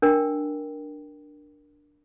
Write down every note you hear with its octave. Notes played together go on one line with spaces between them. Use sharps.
D4 A#4 G5